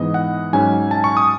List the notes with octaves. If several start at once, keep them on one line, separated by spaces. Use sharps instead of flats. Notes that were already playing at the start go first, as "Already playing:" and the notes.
Already playing: G#2 E3 B3 D#5
F#5
G#2 F#3 C#4 G#5
A5
C#6
D#6